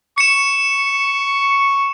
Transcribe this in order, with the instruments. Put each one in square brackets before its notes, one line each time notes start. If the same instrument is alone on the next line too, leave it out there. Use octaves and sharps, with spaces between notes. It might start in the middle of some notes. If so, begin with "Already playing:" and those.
[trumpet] C#6 [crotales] C#7 E7